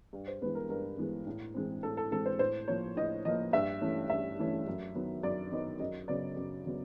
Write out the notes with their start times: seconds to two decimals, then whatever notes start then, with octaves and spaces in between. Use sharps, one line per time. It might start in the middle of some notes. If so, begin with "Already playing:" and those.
0.13 G2
0.28 C5
0.42 E3 G#3 B3 B4
0.55 A#4
0.69 G2 A#4
0.98 E3 G#3 B3
1.26 A2
1.54 E3 G#3 C4
1.83 A2 A4
1.97 A4
2.11 E3 G#3 C4 A4
2.26 C5
2.39 A2 C5
2.68 F3 A#3 C#5
2.97 A2 D#5
3.25 F3 A#3 D#5
3.53 G2 E5
3.81 E3 A3 C#4
4.10 G2 E5
4.39 E3 A3 C#4
4.67 F#2
4.95 D#3 F#3 B3
5.23 F#2 D5
5.51 D#3 F#3 B3 D#5
5.80 F#2 D#5
6.08 C#3 F#3 B3 D5
6.36 F#2
6.65 C#3 F#3 B3